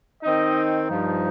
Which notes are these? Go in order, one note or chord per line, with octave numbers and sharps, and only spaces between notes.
D#3 C4 D#4 D#5
G2 F3 D#4